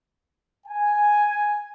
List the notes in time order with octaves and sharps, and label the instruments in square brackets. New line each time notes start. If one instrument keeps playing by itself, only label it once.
[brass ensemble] G#5